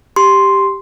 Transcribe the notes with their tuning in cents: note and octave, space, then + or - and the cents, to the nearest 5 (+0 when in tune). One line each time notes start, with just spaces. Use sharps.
G4 +0 C6 +0